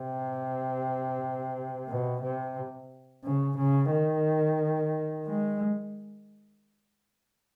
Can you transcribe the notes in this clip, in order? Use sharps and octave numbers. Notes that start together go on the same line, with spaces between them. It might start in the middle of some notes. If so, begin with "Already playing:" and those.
Already playing: C3
B2
C3
C#3
C#3
D#3
G#3